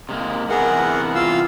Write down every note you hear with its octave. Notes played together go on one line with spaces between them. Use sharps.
C3 G#3 A#3
C3 E3 B3 G#4 A#4 F#5
F4 F5 E6